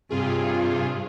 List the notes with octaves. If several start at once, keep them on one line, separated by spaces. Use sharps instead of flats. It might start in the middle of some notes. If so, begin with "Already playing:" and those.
G2 C3 F4 G#4